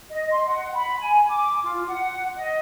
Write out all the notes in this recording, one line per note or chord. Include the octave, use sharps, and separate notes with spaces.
D#5
C6
F#5
B5
G#5
D6
F4
F#5
D#5